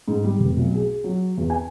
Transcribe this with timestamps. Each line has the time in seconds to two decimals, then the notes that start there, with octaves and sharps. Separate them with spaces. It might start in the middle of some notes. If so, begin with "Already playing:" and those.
0.08 G#2
0.24 G3
0.39 F1
0.57 B1
0.75 G#4
1.04 F#3
1.38 E2
1.50 G#5